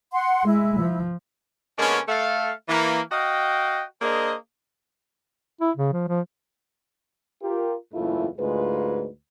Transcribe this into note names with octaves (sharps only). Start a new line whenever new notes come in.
F#5 C6
G#3 E4
F3
D3 G#3 A#3 B3 C#4
A3 A4 E5 F5
E3 A#3
F#4 D#5 F5 G5
A#3 D4 G#4 A#4 C5 D#5
E4
C#3
F3
F3
F4 G4 A#4
F#1 E2 G#2 A3 E4 F4
D2 G#2 G#3 F4 B4